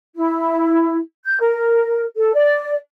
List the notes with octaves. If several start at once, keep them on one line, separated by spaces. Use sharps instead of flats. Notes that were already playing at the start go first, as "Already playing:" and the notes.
E4
G6
A#4
A4
D5